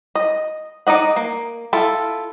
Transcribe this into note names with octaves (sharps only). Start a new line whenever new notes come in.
D#5
D#4 D5 D#5 F#5
A#3
E4 F4 A4